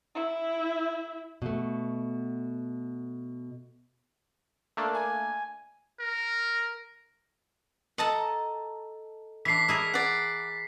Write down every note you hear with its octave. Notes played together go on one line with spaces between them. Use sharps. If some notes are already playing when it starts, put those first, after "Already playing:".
E4 E5
B2 A3
A3 A#3 D4
G#5
A#4
A4 D#5 F#5 A5 A#5
E3 D4 B6 C7
E4 G#4 A#4
D5 F#5